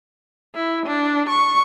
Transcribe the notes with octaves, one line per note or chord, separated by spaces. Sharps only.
E4
D4
C#6